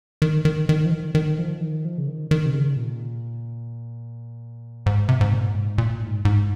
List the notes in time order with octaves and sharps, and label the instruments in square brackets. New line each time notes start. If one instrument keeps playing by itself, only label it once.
[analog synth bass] D#3
D#3
D#3
F3
D#3
D#3
F3
D#3
F3
C#3
D#3
D#3
C3
C#3
A#2
G#2
C3
G#2
A#2
G#2
A#2
G#2
G#2